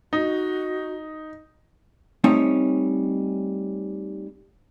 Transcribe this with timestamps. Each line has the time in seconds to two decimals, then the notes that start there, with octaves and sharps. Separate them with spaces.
0.13 D#4 F#4
2.24 G3 A3 C4 C#4 D#4 C#5